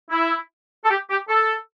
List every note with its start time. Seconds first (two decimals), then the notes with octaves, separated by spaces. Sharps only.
0.11 E4
0.85 A4
0.90 G4
1.10 G4
1.29 A4